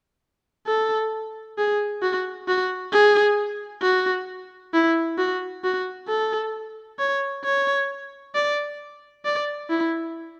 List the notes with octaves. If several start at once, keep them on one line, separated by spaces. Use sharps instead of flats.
A4
G#4
F#4
F#4
G#4
F#4
E4
F#4
F#4
A4
C#5
C#5
D5
D5
E4